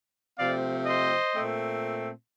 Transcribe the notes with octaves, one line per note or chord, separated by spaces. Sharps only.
C3 F3 A3 C4 D5 F5
C5 D#5
A#2 A3 C4